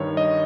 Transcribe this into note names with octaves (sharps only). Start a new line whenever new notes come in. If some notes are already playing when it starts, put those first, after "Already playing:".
Already playing: G2 D#3 C#5
D#5